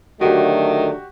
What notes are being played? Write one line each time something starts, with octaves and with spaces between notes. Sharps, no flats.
D3 D#3 F#3 A3 F#4 G4